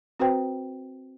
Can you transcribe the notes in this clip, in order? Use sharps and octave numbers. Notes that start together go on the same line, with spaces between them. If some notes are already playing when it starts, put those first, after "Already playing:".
C4 F#4 B4 C5 G5